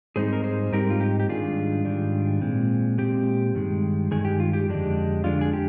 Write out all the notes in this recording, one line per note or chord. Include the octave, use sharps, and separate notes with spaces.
G#2 G3 C4 D#4 G#4 C5
A#4
G#4 C5
G#2 G3 C4 D#4 G4 A#4
F4
G4
G4
G#2 D#3 G3 D4 F4 G#4
G#2 D#3 G3 D4
A#2 G#3 C4
A#2 G#3 C4 G4
G2 D#3 G#3
G2 D#3 G#3 G#4
G4
F4
G4
F2 D3 G#3 D4
F2 D3 G#3 D4 F4
G#4
G4